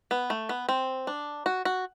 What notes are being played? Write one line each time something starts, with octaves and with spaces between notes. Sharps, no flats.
B3
A3
B3
C4
D4
F#4
F#4